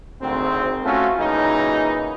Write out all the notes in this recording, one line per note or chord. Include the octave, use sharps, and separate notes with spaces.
G#1 D2 C4
A3 C#4 F4 F#4
A#2 C#3 E3 F#3 D#4